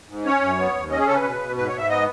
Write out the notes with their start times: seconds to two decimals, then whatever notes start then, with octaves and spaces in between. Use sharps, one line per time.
0.09 G#2
0.25 C#4 C#5
0.42 F#2
0.58 B3
0.75 D#2
0.91 C#4 D#5
0.99 G#4
1.07 C#3 A4
1.15 B4
1.24 B2
1.40 B2
1.57 G#2 B4
1.67 C#5
1.73 G#2
1.78 E5
1.89 B3 D#5